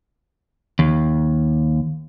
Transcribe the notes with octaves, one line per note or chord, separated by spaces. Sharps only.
D#2